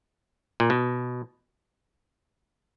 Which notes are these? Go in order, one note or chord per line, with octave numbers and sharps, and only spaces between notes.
A#2
B2